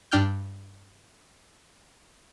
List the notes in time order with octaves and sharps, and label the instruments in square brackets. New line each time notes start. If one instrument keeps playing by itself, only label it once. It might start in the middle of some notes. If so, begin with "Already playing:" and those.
[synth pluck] G2 D4 G5 F6 G6